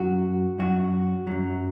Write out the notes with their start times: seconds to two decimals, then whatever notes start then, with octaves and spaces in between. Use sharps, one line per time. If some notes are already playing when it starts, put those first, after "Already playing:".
Already playing: F#2 F#3 F#4
0.58 F#2 F#3 F#4
1.27 F#2 F#3